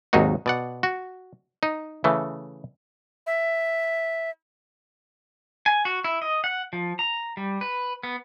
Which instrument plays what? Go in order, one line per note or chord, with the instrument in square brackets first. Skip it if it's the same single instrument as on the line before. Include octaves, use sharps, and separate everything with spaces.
[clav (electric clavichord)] G#1 D#2 F#3 D#4 F#4
B2 D5 F#5
F#4
D#4
C#3 E3 A3
[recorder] E5
[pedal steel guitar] G#5
F#4
E4
D#5
F#5
F3
A#5
G3
B4
B3